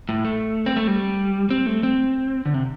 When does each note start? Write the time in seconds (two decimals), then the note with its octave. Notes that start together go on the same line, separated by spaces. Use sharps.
0.09 A2
0.25 A3
0.66 C4
0.76 A3
0.87 G3
1.50 C4
1.66 A3
1.83 C4
2.46 D3
2.54 C3